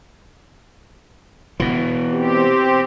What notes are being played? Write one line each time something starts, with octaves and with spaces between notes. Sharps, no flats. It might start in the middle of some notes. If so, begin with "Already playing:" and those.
B2 E3
C4 G4